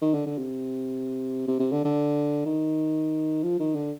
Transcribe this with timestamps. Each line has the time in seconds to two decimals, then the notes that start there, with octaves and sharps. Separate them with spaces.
0.02 D#3
0.14 D3
0.26 D3
0.38 C3
1.48 C3
1.60 C3
1.73 D3
1.85 D3
2.46 D#3
3.43 F3
3.59 D#3
3.75 D3